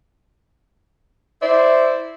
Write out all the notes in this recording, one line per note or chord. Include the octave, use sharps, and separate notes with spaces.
E4 C5 D5 E5